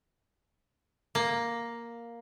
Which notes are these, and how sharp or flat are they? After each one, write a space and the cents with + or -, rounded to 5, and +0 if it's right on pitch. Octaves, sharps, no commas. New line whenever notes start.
A#3 +5